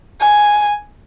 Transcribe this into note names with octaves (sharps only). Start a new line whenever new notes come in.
G#5